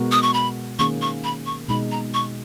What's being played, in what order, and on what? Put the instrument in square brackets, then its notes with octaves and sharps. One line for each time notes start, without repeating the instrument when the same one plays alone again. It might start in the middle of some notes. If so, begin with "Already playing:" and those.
Already playing: [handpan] B2 G#3 B3 F#4 A#4
[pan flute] D#6
C#6
B5
[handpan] D#3 A#3 C#4 G#4 [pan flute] C#6
[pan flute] C#6
B5
C#6
[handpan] B2 G#3 D#4 [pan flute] B5
[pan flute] A#5
C#6